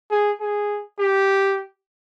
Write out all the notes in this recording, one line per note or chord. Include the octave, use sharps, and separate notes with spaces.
G#4
G#4
G4